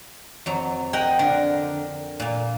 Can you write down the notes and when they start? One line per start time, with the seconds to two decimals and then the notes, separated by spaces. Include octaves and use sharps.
0.46 F2 F#3 A#5
0.93 A#4 D#5 F#5 G5
1.19 D3 A#4
2.20 A#2 A#3